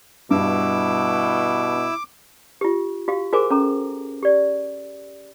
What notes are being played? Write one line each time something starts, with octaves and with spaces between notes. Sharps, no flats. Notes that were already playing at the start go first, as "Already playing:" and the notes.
G2 B2 E4 D6 E6
F4 G4
F#4 G4 F5
F#4 G#4 A#4 C5 G#5 D6
C#4 A4 A#5
G4 D5